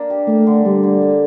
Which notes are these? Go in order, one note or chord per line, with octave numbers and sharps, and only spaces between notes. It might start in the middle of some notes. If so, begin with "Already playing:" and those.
Already playing: A#3 D4 A#4
G4
A3 A#3
D3
D3 G3
D3
A#3